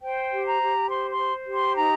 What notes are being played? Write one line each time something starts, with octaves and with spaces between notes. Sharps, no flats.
C5 G5
G4
A#5
G4
C5 C6
C6
C5
G4
C6
D#4 A#5